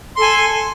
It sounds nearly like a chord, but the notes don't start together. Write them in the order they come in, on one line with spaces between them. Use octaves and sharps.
C6 A4 G#5